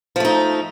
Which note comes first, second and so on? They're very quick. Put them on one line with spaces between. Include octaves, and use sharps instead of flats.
F3 A3 D#4